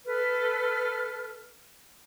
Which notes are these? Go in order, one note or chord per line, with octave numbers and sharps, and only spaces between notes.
A4 B4 F6